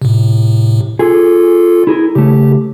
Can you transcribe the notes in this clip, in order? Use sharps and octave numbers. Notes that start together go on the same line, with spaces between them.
A2 C3
F4 G#4 A4
E4 G#4 A#4
C#3 A3 G4